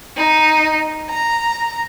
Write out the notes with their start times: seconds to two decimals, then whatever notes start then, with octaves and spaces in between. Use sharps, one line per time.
0.17 D#4
1.10 A#5